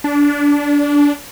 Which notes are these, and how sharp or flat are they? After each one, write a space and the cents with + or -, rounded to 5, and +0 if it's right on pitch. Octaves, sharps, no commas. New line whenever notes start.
D4 -20